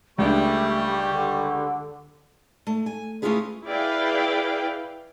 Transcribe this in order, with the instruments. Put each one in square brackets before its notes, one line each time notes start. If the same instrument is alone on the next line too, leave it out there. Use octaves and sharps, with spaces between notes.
[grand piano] C#2 D4 [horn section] G3 [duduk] A3 [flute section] G4 C#6
[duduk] D3
[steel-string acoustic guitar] A3
G#5
A3 C#4 E4 F4 G#4 B4
[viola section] E4 G#4 B4 D5 F5 G5